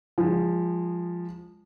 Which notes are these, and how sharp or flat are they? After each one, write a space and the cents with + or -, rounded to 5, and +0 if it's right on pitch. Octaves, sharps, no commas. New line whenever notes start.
F3 +0 G#3 -25